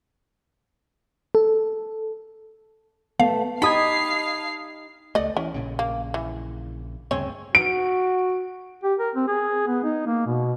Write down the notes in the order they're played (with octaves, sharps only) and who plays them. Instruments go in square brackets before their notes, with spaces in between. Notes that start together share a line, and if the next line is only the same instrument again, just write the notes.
[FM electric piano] A4
[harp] A3 A4 [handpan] B3 [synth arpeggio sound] F5
[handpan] D#4 G4 [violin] F5 C7 [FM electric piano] A5 D#6 G#6 [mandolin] B5
[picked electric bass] C#2 A3 [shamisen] D5 D#5
[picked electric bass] E3 [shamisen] C#4
[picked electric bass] A#1 A#2 C#3
[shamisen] A#3
E3
[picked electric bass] D2 G2 C#3 [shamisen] C4 C#4 C#5
[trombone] F#4 [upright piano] D7
[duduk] G4
A#4
C4
G#4
B3
D#4
A#3
B2